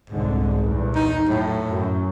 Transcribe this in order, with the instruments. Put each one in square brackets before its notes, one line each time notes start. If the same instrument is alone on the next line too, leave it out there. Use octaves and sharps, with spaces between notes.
[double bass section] F1 C2 D3 [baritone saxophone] G#2
[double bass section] E2 G2 A#2
[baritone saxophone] D#4
[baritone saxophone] A2 [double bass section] F#3
[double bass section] F#2